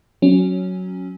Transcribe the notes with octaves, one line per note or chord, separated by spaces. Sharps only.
F#3 C#4